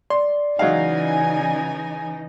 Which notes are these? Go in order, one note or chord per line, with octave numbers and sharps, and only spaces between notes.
D5 C6
C#3 E3 F#3 G#3 D#4 F5 G#5